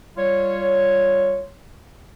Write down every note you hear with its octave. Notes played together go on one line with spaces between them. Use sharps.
G3 F4 C#5